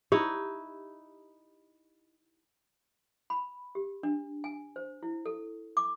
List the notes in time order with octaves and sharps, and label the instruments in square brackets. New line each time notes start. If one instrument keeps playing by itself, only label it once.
[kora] D#4 E4 [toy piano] G4
[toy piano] B5
G4
D4
G#5
C5
E4
A4
D6